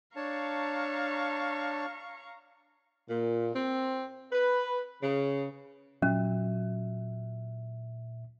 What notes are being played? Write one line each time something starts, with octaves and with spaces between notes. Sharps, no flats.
D4 C#5 F5 A5 A#5 C#6
A#2
C4
B4
C#3
A#2 F#3 C#4 E5